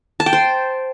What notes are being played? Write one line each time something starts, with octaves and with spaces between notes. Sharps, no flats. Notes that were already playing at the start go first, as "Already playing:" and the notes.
A5
G5
C5